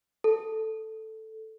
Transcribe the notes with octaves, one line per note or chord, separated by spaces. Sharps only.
A4